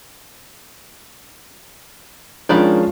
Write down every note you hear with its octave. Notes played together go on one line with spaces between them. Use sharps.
D#3 F3 G#3 C#4 D4 B5